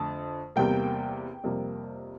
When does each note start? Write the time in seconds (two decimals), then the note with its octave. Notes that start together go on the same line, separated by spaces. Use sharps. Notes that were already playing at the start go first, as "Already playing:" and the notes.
Already playing: F2 D3 A3 A5
0.56 E2 C3 G3 A#3 G5
1.44 F2 C3 G3 A#3